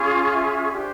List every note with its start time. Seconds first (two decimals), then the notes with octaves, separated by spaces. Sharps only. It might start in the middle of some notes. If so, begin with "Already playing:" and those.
Already playing: C#4 F4 G#4
0.32 E5
0.72 D4 G4 C5